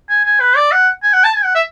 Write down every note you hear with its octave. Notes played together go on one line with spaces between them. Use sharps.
G#5
G#5
B4
D5
F#5
G#5
F#5
A5
G#5
F#5
E5